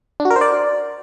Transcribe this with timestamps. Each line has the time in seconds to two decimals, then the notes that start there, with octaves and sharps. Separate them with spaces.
0.20 D4
0.25 F#4
0.31 A#4
0.36 C5
0.41 D5